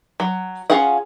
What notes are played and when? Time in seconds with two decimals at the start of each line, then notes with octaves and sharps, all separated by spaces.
0.20 F#3
0.70 C#4 F4 G#4 F5 F#5